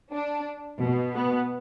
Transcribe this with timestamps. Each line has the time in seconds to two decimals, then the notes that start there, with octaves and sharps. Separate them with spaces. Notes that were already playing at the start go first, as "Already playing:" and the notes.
0.11 D4
0.81 B2
1.16 B3